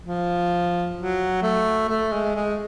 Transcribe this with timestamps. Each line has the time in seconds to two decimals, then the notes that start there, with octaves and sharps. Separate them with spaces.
0.03 F3
0.96 F#3
1.43 A3
1.89 A3
2.13 G#3
2.36 G#3